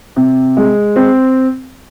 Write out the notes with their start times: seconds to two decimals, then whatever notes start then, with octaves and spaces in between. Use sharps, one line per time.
0.16 C3
0.57 G#3
0.96 C4